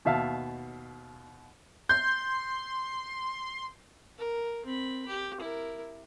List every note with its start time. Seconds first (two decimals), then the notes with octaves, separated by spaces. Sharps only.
0.05 D#2 B2 E5 F5 A5
1.89 C6 G6
4.19 A#4
4.65 C4 B5
5.08 G4
5.40 E4 A#4